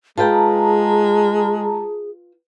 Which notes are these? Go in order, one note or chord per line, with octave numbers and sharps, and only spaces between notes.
G#3 F4 G#4 B4 G5 A5 A#5